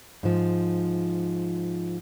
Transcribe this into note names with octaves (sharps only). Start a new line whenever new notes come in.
G#2 F3